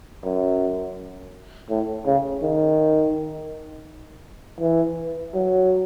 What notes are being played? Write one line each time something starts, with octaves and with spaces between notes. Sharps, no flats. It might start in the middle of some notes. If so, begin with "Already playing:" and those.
F#2
A2
C#3
D#3
E3
F#3